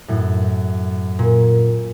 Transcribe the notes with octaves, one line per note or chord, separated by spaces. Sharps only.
F#2 A2
A#2